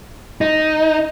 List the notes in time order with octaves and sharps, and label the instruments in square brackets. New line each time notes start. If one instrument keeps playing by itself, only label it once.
[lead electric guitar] D#4